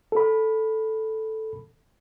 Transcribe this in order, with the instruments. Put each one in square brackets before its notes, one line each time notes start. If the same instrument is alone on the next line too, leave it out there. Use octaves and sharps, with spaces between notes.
[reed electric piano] A4 B5